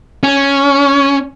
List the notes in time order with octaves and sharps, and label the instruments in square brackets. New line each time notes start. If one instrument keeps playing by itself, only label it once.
[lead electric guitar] C#4